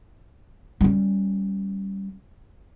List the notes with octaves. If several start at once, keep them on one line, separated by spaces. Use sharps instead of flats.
G3 C#4